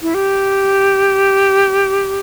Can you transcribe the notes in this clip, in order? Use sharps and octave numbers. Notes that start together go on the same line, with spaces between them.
E4
G4